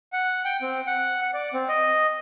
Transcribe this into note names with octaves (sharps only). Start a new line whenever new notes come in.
F#5
G5
C4
F#5
F#5
D5
C4
D#5